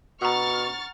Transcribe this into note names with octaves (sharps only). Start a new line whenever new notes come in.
B2 F#5 A#5 C#6 F6 A6